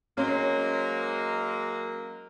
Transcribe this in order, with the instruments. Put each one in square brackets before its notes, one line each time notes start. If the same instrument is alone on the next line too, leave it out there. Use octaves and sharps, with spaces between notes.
[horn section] F#3 G#3 A#3 [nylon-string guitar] C#4 C5